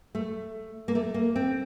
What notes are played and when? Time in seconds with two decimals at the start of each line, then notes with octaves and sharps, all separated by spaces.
0.15 A3
0.88 A#3
0.95 A3
1.14 A#3
1.36 C4